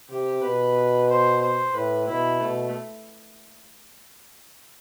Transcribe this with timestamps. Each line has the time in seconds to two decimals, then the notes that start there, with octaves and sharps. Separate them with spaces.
0.09 C3 G4
0.42 B2 B4
1.09 C5
1.41 C5
1.74 A2 B4
2.08 B2 E4
2.41 B2 A3